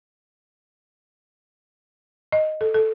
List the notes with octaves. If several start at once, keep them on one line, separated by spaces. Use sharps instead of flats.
D#5
A4
A4